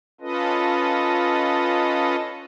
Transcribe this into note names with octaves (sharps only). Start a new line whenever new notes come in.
C#4 F4 A4 B4 D#5